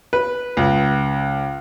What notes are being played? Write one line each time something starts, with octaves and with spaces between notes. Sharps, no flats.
B4
C#2